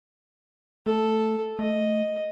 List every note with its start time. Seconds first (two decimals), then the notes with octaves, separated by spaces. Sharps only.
0.86 A3 A4
1.59 A3 D#5